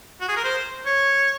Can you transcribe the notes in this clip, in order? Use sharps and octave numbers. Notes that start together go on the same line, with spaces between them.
F#4
G#4
A#4
C5
C#5